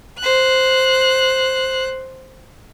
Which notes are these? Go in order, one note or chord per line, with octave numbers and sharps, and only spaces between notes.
C5 F#6